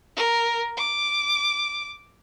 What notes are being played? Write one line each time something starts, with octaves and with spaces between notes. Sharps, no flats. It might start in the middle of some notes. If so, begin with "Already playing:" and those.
A#4
D6